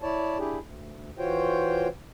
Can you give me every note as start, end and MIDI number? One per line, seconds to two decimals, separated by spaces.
0.02 0.38 64
0.02 0.38 73
0.02 0.38 74
0.02 0.38 81
0.39 0.59 62
0.39 0.59 64
0.39 0.59 67
0.39 0.59 68
0.60 1.09 38
1.18 1.88 52
1.18 1.88 65
1.18 1.88 66
1.18 1.88 72
1.18 1.88 73
1.18 1.88 79